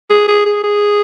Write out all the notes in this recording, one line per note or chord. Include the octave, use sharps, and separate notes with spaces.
G#4
G#4
G#4
G#4